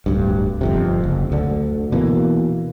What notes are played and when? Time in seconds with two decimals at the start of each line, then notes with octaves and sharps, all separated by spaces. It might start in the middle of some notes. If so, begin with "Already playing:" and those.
0.06 D1 D2 G2
0.61 G1 F2 C3
1.04 F#1
1.32 D2 D3
1.92 B2 E3 A#3